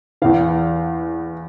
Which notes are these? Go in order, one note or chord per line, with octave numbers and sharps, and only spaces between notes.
E2 E3 F5